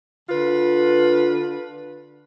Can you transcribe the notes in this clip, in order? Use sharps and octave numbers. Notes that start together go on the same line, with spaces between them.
D3 F4 B4